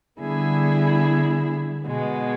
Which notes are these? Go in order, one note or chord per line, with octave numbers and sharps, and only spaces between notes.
D3 G3 B3 E4 G#4
B2 G#3 B3